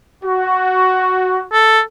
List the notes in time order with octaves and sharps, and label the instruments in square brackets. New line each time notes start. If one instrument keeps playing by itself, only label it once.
[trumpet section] F#4
[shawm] A4